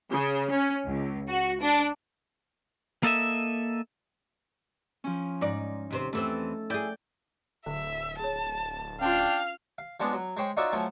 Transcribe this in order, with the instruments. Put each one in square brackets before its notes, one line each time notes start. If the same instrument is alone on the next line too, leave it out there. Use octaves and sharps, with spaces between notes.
[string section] C#3
C#4
C#2
F#4
D4
[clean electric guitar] A#3 A4 D#5 E5
[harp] F3 C#4
[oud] G#2 D5 [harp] D#4
[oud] D#2 C3 C5
[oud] E2 E3 C4 [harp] A3 A4
[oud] E4 G#4 [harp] D5 G5 G6
[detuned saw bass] D1 [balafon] D3 [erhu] E5
[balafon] G#4 C#5 [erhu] A5
[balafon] C#4 F4 [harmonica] D4 G5 [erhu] F5
[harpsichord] F5
F3 G#3 B3 C#4 D4
F#3
G#3 C5 C#5 G5
D#4 F4 F#4 C#5 D5 E5
F3 F#3 A3 C#4